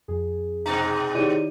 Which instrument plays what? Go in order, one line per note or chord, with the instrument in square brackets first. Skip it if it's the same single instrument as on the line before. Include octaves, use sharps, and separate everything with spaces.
[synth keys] F2 G#4
[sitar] G#2 B2 D#4 [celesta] A#5
[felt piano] D#3 G4 [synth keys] E4 C#7 [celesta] C#5 D5 D#7